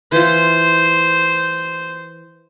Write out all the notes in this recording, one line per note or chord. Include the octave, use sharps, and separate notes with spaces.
E3 F4 C5